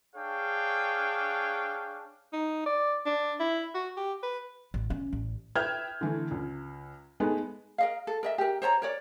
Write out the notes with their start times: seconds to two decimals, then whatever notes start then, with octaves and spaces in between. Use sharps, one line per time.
0.16 D4 G#4 C#5 F5 G5
2.33 D#4
2.66 D5
3.06 D4
3.40 E4
3.75 F#4
3.97 G4
4.23 B4
4.74 A1
4.90 C#4
5.13 A1
5.56 B4 E5 G5 F6 G6 G#6
6.01 D3 E3 A3
6.31 C#2
7.20 G#3 A3 B3 D#4 G#4
7.78 A#4 D#5 F5
8.07 A4
8.23 A#4 D#5 E5
8.38 G4 A#4
8.62 C5 C#5 A5 A#5
8.82 A#4 C#5 D5